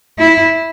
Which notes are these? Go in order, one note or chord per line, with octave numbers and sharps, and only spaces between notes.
E4